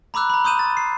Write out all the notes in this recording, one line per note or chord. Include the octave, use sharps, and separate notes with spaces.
A#5 B5 D6 E6 F#6
A#5 B5
C6 D#6 G6 D#7 E7
A6
C7